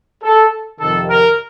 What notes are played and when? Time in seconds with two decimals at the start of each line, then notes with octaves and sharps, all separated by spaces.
0.23 A4
0.80 F2 C3 D#3 A4
1.09 A#4